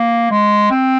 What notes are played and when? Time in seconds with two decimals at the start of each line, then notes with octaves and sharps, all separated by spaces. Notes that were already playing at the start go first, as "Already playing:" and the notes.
Already playing: A#3
0.31 G#3
0.71 C4